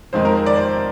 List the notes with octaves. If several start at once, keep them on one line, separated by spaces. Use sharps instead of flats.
F2 D#3 G#3 C5
A#4
C5
D5
C5